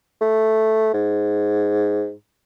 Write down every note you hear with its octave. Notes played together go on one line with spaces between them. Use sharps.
A3
G#2